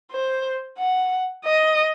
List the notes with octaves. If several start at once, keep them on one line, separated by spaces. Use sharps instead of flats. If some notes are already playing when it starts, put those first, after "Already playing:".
C5
F#5
D#5